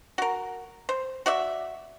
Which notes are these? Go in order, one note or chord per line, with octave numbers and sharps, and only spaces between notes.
F#4 A#4
C5
F#4 D5 E5